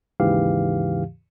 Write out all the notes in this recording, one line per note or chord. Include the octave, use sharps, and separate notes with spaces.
D#2 G#2 C#3 E3 G4 F5